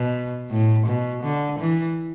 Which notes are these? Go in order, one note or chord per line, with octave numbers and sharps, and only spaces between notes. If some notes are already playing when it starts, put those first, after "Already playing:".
Already playing: B2
A2
B2
D3
E3